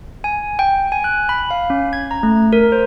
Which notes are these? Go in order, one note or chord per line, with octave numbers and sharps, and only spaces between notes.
G#5
G5
G#5
F#6
B5
F5
C#4
G#6
A#5
A3
A#4
C5